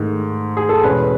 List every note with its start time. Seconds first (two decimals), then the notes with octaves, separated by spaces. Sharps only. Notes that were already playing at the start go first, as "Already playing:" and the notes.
Already playing: G#2 D#3 A3
0.57 G#4
0.69 A4
0.83 E2 B2 G#3 C#4 B4